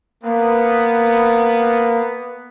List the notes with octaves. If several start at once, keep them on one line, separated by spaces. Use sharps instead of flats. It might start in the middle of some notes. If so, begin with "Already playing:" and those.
A#3 B3